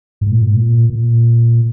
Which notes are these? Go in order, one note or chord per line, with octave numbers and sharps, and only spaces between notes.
G#2
A#2
G#2
A#2
A#2